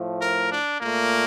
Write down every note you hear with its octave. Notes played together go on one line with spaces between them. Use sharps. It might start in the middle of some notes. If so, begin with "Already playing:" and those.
Already playing: A2 F3 A3
A#4
D4
A#2 A3 A#3